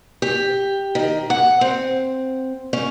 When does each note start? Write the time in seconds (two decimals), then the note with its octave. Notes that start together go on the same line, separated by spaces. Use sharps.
0.22 G4
0.95 D#3
1.30 F#5
1.61 C4
2.73 C#4